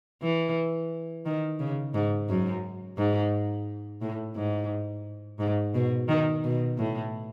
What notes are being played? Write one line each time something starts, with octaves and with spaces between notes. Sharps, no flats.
E3
D#3
C#3
G#2
F#2
G#2
A2
G#2
G#2
B2
D#3
B2
A2